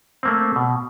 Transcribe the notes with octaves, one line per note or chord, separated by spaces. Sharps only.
A3 A#3 C4
B2